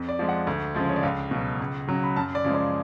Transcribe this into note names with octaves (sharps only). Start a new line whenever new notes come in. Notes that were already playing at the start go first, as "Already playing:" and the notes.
Already playing: F2
D5
F3 G#3
F#5
D2
C#3 F3 G#3
C#5
D5
C#2 F5
B2 F#3
C#2
C#3 F#3
B5
F#2 A5
D5
C#3 F3 G#3
D5